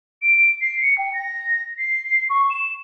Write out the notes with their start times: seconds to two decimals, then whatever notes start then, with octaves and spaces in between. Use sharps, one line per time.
0.22 D7
0.61 C7
0.82 C#7
0.98 G5
1.13 A#6
1.78 C7
2.29 C#6
2.50 E7